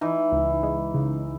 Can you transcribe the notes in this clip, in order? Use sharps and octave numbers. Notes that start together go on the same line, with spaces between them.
E3 D#4
C#2
G#3
C#3